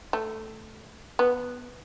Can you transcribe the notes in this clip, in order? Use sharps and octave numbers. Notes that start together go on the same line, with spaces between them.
A3
B3